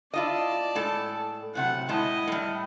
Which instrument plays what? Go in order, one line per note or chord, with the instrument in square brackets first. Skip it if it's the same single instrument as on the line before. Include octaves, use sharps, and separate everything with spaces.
[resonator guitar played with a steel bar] E4 F4 D#5 [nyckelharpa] D5 A5
[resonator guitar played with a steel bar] A2 G#3 A4
[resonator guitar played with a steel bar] A2 C3 F#3 [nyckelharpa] F#5
[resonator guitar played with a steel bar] A2 G#3 A5 [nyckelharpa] E4 D#5
[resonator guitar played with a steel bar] A2 G3